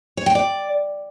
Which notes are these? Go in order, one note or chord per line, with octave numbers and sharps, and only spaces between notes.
C#5
G5
D5